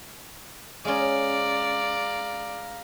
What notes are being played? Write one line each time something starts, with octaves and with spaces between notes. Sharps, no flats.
G#3 C#4 D5 F5 A#5